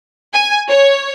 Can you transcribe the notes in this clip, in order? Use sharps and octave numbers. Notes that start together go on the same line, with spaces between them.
G#5
C#5